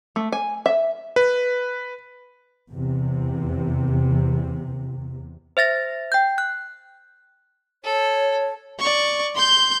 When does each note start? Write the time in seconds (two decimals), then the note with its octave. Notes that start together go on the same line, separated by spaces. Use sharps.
0.16 A3
0.32 G#5
0.66 E5
1.16 B4
2.70 E2 C3
5.57 C5 E5 A6 A#6
6.12 G5 G6
6.38 F#6
7.84 A4 C#5
8.79 D5 C#6
9.35 C6 G6